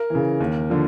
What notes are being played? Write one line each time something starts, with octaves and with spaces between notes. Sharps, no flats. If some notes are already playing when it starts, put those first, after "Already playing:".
Already playing: A#4
C#3 E3
D#2
D3 F3